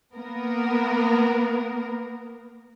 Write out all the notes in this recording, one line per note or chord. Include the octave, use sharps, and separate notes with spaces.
A#3 B3 A#4